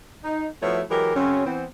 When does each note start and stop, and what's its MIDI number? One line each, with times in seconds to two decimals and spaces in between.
0.23 0.47 63
0.62 0.81 53
0.62 0.81 57
0.62 0.81 59
0.62 0.81 64
0.62 0.81 66
0.62 0.81 73
0.90 1.12 52
0.90 1.12 54
0.90 1.12 56
0.90 1.12 67
0.90 1.12 70
1.14 1.44 42
1.14 1.44 49
1.14 1.44 54
1.14 1.44 60
1.14 1.44 61
1.46 1.64 52
1.46 1.64 59
1.46 1.64 60